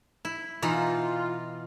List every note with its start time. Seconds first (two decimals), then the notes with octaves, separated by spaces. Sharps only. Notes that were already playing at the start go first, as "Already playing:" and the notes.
0.25 E4
0.62 B2 E3 D#4 F4